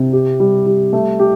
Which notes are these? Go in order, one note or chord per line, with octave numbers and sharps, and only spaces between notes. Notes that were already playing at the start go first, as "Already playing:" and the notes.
Already playing: C3
G4
G3
G3
A3
G4